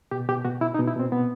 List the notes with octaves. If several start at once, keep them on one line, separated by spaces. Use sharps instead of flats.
B2 G4
B2 G4
B2 F#4
B2 E4
D#4
B2
E4
B2 C4
B2 B3